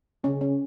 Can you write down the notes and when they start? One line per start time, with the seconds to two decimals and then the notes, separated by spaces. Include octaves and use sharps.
0.24 C#3 C#4
0.41 C#4